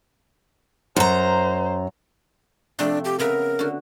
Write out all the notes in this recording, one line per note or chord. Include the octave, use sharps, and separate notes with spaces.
F#2 C5 A#5
C3 F3 A3 D4
G4
C#3 B3 A#4 E5
D3 F#4